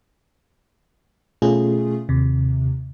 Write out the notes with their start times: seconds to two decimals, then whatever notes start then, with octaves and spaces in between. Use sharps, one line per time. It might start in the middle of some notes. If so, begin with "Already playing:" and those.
1.42 B2 A3 C#4 F4 G#4
2.09 D#2 C3